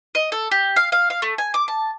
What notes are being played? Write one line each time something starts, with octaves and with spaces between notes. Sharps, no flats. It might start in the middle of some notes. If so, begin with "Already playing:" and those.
D#5
A4
G4
F5
F5
F5
A3
G#5
D6
A5